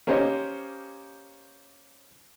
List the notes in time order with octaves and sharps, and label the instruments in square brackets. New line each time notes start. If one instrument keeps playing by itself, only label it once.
[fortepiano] A#3 C#4 G4 C5 C#5 D#5